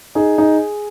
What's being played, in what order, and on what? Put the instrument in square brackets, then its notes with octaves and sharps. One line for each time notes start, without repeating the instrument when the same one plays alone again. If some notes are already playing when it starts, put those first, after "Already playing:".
[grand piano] D#4 G#4
D#4